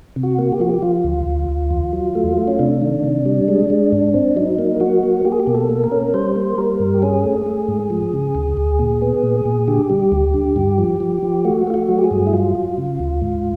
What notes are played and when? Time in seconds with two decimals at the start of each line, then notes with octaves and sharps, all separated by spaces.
0.16 C3
0.23 F#4
0.39 A#3
0.52 G4
0.60 F3 F#4
0.69 G4
0.82 F3 F4
1.04 D2
1.26 D2
1.48 D2
1.71 E2
1.93 F#3
2.15 A3
2.37 A3
2.48 C#4
2.59 C3 D4
2.81 D#3
3.04 C3
3.26 G3
3.48 G#3
3.70 G#3
3.92 G#2
4.14 C4
4.36 F#3 D#4
4.59 A#3
4.80 F#3 F#4
5.03 A#3
5.25 A#3 G4
5.32 G#4
5.40 G4
5.47 B2
5.55 A4
5.69 A#3
5.84 A#4
5.92 C#4
6.14 G3 C5
6.36 A#3
6.58 G3 A#4
6.80 G2
6.94 G4
7.02 C#4 G#4
7.24 A3
7.46 A3
7.68 G#2
7.90 F3
8.13 C#3
8.35 D2
8.57 D2
8.79 A#2
9.02 B3
9.23 A#2
9.45 A#2
9.68 D3 G4
9.90 G3
10.12 D2
10.34 D3
10.56 G2
10.78 F3
11.00 F3
11.23 F3
11.45 A3 F#4
11.67 A3 F4
11.74 F#4
11.89 F#3
11.99 G4
12.04 G#4
12.11 G2
12.27 E4
12.33 F#3 F4
12.55 F#3
12.78 C#3
12.99 D2
13.22 G#2